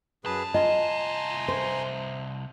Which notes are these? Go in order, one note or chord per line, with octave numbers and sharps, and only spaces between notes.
C2 F#2 G#4 B4 A5
F4 D#5 G#5 A#5 C6
C5